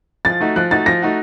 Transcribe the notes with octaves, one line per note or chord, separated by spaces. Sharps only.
F3 A6
A3 D#4 F#4
F3 F#6
A3 D#4 F#4 A6
F3 A#6
A3 D#4 F#4